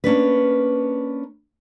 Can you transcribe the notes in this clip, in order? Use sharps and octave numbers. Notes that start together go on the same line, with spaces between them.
A#3 C#4 D4 B4